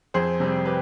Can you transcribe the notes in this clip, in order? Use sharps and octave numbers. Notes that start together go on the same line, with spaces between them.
F2 G#4 C5
C3 G3 C4
G4 B4